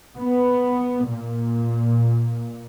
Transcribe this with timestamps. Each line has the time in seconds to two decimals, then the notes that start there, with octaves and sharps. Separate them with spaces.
0.17 B3
1.08 A#2